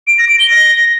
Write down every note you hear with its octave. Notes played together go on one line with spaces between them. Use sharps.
D7
A#6
D7
G7
A#6